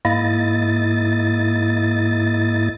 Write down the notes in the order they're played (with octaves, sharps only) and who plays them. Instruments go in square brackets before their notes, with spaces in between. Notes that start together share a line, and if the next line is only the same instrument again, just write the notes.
[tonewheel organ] G#2 A#3 E4 D#5 A6